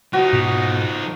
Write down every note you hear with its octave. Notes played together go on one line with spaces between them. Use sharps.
F3 D#4 F#4
G#2 B2